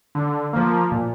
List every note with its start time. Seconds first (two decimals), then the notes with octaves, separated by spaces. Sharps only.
0.15 D3
0.53 F3 A#3
0.92 A#2